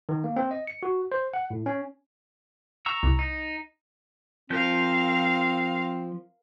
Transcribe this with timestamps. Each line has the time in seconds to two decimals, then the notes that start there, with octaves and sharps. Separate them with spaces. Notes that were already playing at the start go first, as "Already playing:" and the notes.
0.09 D#3
0.24 A#3
0.36 C4
0.51 D#5
0.67 C#7
0.83 F#4
1.12 C5
1.34 F#5
1.50 A2
1.66 C#4
2.86 A#5 C#6 E6
3.03 C2
3.19 D#4
4.50 F3 C4 A#4 F5 G6